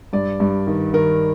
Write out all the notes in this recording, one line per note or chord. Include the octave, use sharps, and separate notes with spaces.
G2 D5
G2
D#3
D#3 A#4